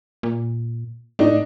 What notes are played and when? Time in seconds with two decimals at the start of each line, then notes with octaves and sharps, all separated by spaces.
0.23 A#2
1.19 A2 D4 D#4